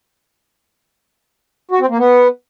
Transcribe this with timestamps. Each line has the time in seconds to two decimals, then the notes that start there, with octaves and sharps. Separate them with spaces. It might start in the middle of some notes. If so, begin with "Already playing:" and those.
1.71 F#4
1.80 C4
1.89 A#3
1.99 B3